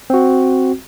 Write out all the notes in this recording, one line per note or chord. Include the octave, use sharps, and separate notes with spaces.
C4 F#4